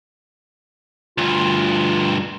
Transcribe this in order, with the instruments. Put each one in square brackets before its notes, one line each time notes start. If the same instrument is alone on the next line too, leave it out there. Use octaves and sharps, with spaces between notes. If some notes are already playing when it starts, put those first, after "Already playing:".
[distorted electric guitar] D2 G2 [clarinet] F4